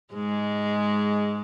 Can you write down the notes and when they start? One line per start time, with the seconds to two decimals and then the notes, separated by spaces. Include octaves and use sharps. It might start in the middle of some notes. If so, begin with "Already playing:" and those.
0.13 G#2 G#3